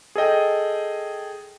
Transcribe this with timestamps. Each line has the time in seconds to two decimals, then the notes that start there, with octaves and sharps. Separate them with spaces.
0.15 G#4 A4 D#5 G5